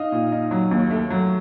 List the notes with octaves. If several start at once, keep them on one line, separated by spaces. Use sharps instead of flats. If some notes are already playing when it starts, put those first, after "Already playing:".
Already playing: D#4 D#5 F5
A#2
D#4
F#3
D#2
A3
F#3